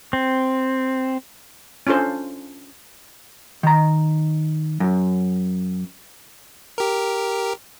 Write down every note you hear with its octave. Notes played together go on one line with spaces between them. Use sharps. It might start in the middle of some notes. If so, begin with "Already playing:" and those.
C4
C#4 D4 F4 A4 C5
D#3 A#5
F#2
G4 A#4